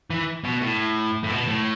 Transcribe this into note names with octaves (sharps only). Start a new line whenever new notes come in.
E3
B2
A2
A2
B2
A2